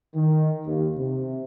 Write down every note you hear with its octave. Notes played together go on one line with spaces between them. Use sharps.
D#3
D#2
C3